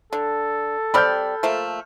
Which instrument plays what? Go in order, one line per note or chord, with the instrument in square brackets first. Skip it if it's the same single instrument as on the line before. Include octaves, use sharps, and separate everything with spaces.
[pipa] D3 [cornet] A4
[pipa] G3 C4 D5 [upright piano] B5 F6 G6
[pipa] F3 A3 A#3